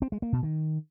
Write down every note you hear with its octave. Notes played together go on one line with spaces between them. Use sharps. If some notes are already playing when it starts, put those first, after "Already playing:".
C4
G#3
A#3
B2
D#3